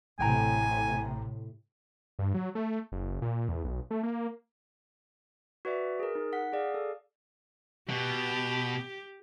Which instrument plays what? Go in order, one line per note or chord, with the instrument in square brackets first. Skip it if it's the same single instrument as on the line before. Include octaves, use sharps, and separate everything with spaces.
[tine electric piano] A1 G5 A#5 [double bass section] A2 C3 [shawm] G#5
[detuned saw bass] G2
F#3
A3
F#1
A#2
E2
B1
A3
A#3
[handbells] F#4 B4 D5 E5
G#4 A#4
D#4
F#5 B6
G#4 D5 F5
A4
[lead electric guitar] B2 [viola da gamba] G4